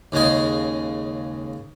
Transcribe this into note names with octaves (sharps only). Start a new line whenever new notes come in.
D#2 C#3 G#3 G#5